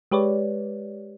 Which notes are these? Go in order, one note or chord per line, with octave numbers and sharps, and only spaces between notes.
G#3 G4 B4 C#5 D5